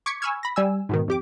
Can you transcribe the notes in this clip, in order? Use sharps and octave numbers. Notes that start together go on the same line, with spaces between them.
C#6 D6 G#6 B6 C#7
G#5 B5 C#6 E6 F6 G#6
B5 A#6
G3 G#5 E6
G#2 B2 D#3
F2 G4 D6